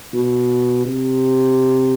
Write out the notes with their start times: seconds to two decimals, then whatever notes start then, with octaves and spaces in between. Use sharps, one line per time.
0.14 B2
0.86 C3